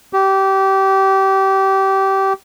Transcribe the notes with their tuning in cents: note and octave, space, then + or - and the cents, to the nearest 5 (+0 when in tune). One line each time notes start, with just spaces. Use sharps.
G4 -25